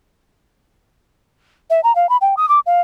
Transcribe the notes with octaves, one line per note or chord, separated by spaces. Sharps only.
E5
A#5
F5
B5
G5
D#6
D6
F5